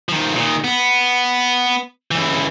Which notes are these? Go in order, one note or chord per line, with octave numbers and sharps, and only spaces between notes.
D#3 F3
A#2 D#3
B3
C#2 E3